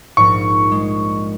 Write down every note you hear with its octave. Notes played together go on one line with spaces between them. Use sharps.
A#1 G#2 C#6
G#3